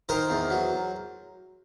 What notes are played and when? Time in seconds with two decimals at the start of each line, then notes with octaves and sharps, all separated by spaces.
0.09 D#3 A#4 C5
0.30 E2
0.50 F#3